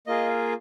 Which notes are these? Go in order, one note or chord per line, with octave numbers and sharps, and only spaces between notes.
A#3 F4 G#4 D#5